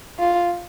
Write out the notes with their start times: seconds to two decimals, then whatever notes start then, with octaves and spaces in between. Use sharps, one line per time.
0.19 F4